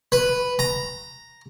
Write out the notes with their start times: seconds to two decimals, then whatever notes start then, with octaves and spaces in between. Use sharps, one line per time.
0.12 B4
0.59 A#5